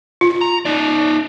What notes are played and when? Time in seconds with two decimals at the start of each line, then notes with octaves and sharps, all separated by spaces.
0.21 F4
0.41 A#5
0.65 D#4 D5